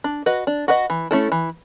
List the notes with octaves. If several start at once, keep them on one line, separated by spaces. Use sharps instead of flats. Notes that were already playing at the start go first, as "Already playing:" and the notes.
D4
F#4 B4 D#5
D4
F#4 B4 D#5
E3
A3 C#4 E4 A4
E3